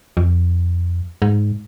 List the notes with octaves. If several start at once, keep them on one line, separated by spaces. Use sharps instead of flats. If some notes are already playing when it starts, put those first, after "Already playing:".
F2
G#2